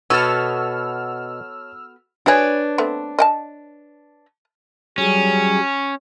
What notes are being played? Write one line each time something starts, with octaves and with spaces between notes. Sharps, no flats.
B2 B3 F#4 A4 C#5 A5 E6 F6
D4 F#4 G#4 B4 C#5
A3 B3 C4
D#5 G5 A5
F#3 G3 C#4 G#4